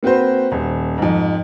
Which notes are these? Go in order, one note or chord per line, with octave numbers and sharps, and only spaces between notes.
A#3 C4 F#4 B4 C5
D#1
F2 G#2